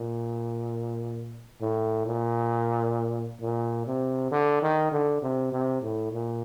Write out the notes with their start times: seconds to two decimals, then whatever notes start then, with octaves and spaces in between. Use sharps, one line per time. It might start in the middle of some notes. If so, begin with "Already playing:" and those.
Already playing: A#2
1.61 A2
2.06 A#2
3.41 A#2
3.87 C3
4.31 D3
4.62 D#3
4.92 D3
5.22 C3
5.52 C3
5.82 A2
6.13 A#2